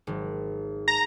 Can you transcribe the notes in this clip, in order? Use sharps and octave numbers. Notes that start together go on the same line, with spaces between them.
G#1 F#3
A5 A#5